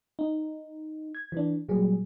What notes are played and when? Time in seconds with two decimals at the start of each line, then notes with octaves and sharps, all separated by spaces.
0.19 D#4
1.15 G#6
1.32 E3 D4
1.69 A#2 F#3 G3 G#4